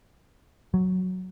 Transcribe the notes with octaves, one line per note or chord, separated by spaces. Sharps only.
F#3